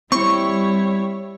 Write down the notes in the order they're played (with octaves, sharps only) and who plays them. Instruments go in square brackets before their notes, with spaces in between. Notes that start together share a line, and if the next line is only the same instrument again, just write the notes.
[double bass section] G3 [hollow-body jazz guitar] C4 [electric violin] E4 C#5 [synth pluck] C#6